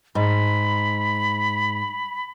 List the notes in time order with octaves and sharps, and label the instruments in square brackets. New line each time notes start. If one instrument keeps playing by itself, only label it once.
[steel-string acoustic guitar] G#2 [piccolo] B5